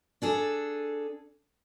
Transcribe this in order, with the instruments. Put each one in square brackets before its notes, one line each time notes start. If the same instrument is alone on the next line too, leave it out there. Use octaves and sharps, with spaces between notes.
[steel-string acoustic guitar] D4 G#4 A4